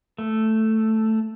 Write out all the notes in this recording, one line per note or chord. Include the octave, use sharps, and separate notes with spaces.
A3